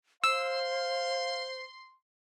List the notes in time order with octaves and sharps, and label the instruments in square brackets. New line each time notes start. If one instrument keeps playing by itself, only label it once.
[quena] C5 [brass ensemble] F5 [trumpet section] C6 [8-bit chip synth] E6